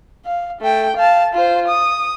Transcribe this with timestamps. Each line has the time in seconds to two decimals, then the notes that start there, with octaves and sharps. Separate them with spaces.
0.25 F5
0.61 A3 G5
0.96 F5 A5
1.33 F4 C5
1.68 D#6